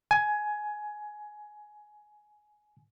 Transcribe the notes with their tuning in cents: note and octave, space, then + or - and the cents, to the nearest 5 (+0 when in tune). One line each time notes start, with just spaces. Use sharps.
G#5 +15